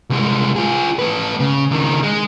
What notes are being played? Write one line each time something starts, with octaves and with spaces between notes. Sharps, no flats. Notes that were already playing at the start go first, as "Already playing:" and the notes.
C2 G#3
F4 G#4
A3 B4
C#3
C#2 D#3
G#3